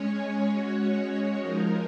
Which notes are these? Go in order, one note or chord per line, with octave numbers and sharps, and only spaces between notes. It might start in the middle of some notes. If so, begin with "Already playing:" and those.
Already playing: G#3 C#4 G#4 C#5
G#3 C#4 F#4 C#5
F3 G#3 D#4 A#4